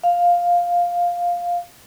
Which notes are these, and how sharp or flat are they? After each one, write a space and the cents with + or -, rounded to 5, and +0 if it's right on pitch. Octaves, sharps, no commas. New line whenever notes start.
F5 +5